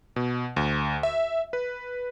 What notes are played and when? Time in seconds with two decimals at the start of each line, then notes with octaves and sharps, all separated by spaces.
0.16 B2
0.56 D2
1.03 E5
1.53 B4